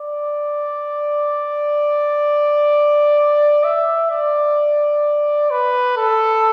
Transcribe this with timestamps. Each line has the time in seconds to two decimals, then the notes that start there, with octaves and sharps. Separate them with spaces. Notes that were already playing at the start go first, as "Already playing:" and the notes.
Already playing: D5
3.64 E5
4.10 D5
5.51 B4
5.97 A4